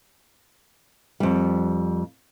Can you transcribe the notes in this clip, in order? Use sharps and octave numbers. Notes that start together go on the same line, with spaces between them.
F2 G3